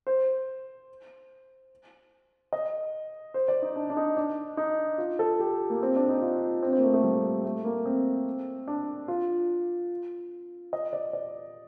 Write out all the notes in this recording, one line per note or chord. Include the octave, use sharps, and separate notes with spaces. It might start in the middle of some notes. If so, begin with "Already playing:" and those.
C5
D#5
C5
D5
D#4
D4
D4
D#4
D4
D#4
F4
A4
G4
A#3
C4
D4
D#4
F4
C4
C4
A#3
A3
A3
G3
A3
A#3
C4
D4
F4
D#5
D5
D5